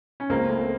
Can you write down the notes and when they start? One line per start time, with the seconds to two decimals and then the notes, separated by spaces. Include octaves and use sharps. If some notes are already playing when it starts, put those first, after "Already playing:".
0.20 C#4
0.29 C#2 A#3 C4
0.49 A3